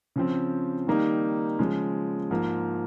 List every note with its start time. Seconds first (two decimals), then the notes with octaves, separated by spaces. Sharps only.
0.16 C#3 F3 C4
0.87 D#3 G3 A#3 D#4
1.59 C#3 F3 G#3
2.30 G#2 F3 A#3